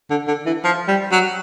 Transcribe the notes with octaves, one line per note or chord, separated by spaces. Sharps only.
D3
D3
E3
F3
G3
F#3